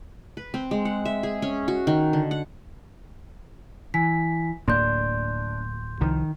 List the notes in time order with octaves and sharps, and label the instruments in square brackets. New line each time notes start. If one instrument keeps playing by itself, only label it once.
[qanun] B4
C4
G#3
F#5
E5
G#4
C#4
F#4
D#3
D3
F#5
[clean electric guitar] E3 [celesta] G#5 B6
[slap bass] D1 A2 A#3 [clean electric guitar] D4 [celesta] C6 G6
[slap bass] C2 F3 [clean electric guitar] D#3